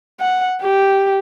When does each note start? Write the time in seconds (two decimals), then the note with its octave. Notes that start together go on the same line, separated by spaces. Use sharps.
0.20 F#5
0.62 G4